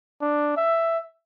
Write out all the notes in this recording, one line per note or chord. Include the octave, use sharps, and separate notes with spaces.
D4
E5